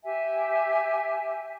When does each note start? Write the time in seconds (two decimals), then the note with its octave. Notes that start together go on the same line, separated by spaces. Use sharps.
0.05 G4 E5 G#5